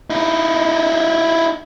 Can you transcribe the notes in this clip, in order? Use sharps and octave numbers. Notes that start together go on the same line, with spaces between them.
D#4 E4